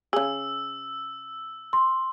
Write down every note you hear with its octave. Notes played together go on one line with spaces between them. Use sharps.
C#3 G#4 E6
C6